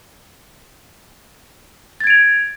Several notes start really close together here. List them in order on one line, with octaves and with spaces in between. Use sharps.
A6 G#6 D7 F7